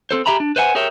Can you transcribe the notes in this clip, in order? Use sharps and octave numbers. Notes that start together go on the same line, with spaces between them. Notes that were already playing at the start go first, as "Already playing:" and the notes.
C4 A4 C5
G4 G#4 E5 A#5 B5
D4
B4 C5 E5 F#5 G#5
G4 G#4 A#4 C#5 E5 G5